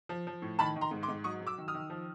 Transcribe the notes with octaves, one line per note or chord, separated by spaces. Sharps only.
F3
F3
A2
D#3 A5 B5
D#3
A#5 C6
G#2
C6 D6
G#2
F#3 C#6 D#6
F#3
D6 E6
D#3
D#6 F6
D#3
F3